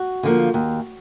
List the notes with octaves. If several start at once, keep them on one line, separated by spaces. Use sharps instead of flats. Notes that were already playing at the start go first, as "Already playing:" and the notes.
Already playing: F#4
D3 F3 A#3
D#2